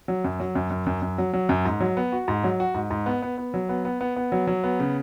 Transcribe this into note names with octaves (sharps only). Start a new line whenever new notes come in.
F#3
F#2
F#3
F#2
F#2
F#2
F#2
F#3
F#3
F#2
G#2
F#3
B3
F#4
G#2
F#3
F#4
G#2
G#2
B3
B3
B3
F#3
B3
B3
B3
B3
F#3
F#3
B3
C#3